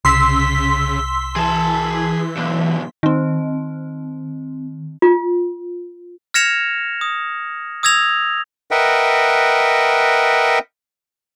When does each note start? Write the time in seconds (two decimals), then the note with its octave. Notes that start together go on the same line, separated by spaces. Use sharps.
0.05 C2 C#3 C6 E6 B6
1.36 E3 G#4 A5
2.37 B1 E2
3.03 D#3 C4
5.02 F4
6.34 F6 G#6 A#6 C#7 E7 F7
7.01 D#6
7.83 D#6 E6 G#6 A#6 F7
8.71 A#4 B4 D#5 E5 F#5 G5